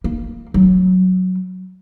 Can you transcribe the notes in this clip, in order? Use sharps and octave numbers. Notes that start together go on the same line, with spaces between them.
A#3
F#3